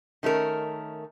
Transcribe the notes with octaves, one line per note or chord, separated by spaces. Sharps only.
D#3 A3 C#4 A#4